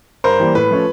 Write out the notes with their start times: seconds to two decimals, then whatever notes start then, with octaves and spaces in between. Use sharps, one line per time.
0.24 G2 A#4 C5
0.40 E3 G3 A#3
0.55 A2 B4
0.71 F3 A3 C#4